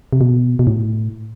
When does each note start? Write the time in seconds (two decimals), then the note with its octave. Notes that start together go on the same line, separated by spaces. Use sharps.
0.13 C3
0.21 B2
0.59 B2
0.67 A2